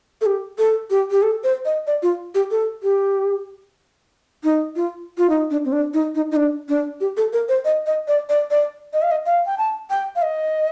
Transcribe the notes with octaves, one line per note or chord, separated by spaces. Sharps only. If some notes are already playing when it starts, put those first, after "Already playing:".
A4
G4
A4
G4
G4
A4
C5
D#5
D5
F4
G4
A4
G4
D#4
F4
F4
D#4
D4
C4
D4
D#4
D#4
D#4
D4
D4
G4
A4
A#4
C5
D#5
D#5
D5
D5
D5
D#5
F5
D#5
F5
G5
A5
G5
F5
D#5